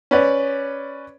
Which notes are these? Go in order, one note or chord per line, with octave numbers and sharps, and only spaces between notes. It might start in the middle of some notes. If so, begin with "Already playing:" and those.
C#4 B4 D5